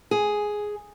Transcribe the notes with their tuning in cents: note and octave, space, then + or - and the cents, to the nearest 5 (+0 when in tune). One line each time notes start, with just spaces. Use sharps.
G#4 +5